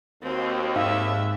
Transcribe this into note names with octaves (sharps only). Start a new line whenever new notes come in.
D#2 C4 F#4
G#2 D#4 E5 F5